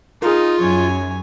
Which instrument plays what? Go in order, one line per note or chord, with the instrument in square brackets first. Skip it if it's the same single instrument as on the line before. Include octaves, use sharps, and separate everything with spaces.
[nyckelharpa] D#4 [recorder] F4 [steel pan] G#4 A#4
[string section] F#2 [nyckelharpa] C#5 G#5